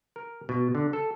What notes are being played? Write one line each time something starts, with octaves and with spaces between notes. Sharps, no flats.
A#4
B2
D3
A4